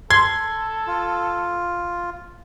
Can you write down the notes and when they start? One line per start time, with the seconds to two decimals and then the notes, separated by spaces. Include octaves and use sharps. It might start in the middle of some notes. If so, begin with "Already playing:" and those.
0.10 A4 C6 G#6
0.87 F4